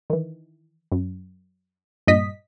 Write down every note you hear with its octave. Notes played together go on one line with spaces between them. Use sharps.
D#3 E3
F#2
G2 A#2 D#5 B6